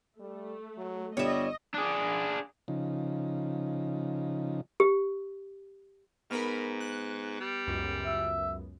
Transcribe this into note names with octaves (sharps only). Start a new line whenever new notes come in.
G3 A3
F#3
G1 G3 C#5 D#5 E5
D4 G#4
C#3 F3 D#4
G4
G#2 B3 A#4 B5 F6
F#6
G3
C#2 F#2
E5